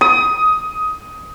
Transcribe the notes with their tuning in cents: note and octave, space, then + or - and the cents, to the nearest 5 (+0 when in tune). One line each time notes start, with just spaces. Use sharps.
D#6 +15